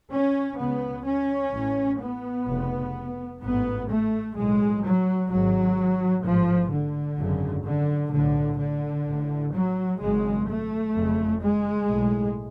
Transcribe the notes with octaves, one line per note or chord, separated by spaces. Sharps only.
C#4
C#2 C#3 B3
C#4
A1 A2
B3
F1 F2 C#3
A1 G#2 B3
A3
B1 A2 G#3
F#3
G#1 G#2 F#3
A1 G#2 F3
D3
G#1 F#2 C#3
D3
B1 A2 D3
D3
A1 A2
F#3
G#1 F#2 C#3 G#3
A3
F#1 F2 C#3
G#3
B1 A2